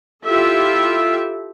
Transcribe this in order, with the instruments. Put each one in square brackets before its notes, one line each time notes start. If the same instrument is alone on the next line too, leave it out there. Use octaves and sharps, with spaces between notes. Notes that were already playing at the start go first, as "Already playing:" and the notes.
[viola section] E4 F4 G4 A4 E5